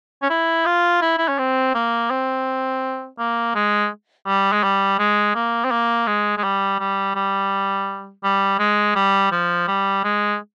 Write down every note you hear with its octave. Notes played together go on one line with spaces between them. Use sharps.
C#4
E4
F4
E4
E4
C#4
C4
A#3
C4
A#3
G#3
G3
G#3
G3
G#3
A#3
C4
A#3
G#3
G#3
G3
G3
G3
G3
G#3
G3
F3
G3
G#3